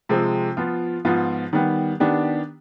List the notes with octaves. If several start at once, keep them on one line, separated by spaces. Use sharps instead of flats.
C3 F3 G#3 C4
F3 B3 F4
G#2 F3 B3 F4
D#3 G3 B3
D#3 B3 D4 G4